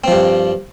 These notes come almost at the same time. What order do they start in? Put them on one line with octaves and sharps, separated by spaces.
C4 F3 G2